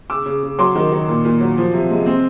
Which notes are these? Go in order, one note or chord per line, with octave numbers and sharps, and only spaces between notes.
C#3 D6 E6
C#3
C#3
F#3 C6 D6
D#3
D#3
A#2
A#2
F#3
F3
C3
G#3
C4